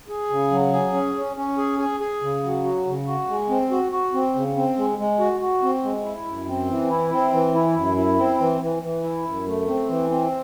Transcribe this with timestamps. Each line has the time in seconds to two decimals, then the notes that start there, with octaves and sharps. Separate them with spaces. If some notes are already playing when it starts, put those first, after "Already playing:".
0.08 G#4
0.30 C#3
0.51 F#3
0.73 G#4
0.93 C#4
1.15 C#4
1.37 C#4
1.57 G#4
1.79 G#4
2.00 G#4
2.22 C#3
2.43 F#3
2.64 F#4
2.86 C#3
3.07 F#4
3.28 G#3
3.49 C4
3.71 F#4
3.92 F#4
4.14 C4
4.35 C#3
4.56 C4
4.77 G#3
4.99 G#3
5.19 F#4
5.41 F#4
5.63 C4
5.83 G#3
6.05 E4
6.27 F#2
6.48 C4
6.69 E3
6.90 E4
7.12 C4
7.33 E3
7.55 E4
7.76 F#2
7.97 E4
8.18 C4
8.39 E3
8.61 E3
8.83 E3
9.04 E4
9.25 F#2
9.47 A3
9.68 C4
9.89 E3
10.10 C4